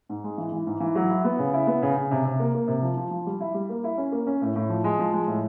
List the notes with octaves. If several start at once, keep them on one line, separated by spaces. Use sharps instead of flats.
G#2
G#3
E3
E3
G#2
E3
F#3
E4
B3
C#3
E4
B3
C#3
C#3
C3
C3
A#3
A#3
C3
F3
F3
F3
G3
E4
G3
A#3
E4
C#4
A#3
C#4
A2
A2
F3
G#3
F3
G#3
A2